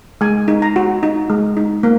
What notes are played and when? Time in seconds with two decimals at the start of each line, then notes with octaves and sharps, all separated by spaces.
0.21 G#3 G#5
0.48 D#4
0.62 A#5
0.76 F#4
1.03 D#4
1.30 G#3
1.57 D#4
1.83 A#3